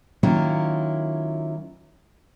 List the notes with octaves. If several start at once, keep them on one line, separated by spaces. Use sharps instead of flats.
D#3 F#3 A#3 C#4 E4 F4